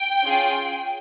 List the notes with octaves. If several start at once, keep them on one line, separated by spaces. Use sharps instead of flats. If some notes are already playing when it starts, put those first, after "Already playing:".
Already playing: G5
C#4 F4 G#4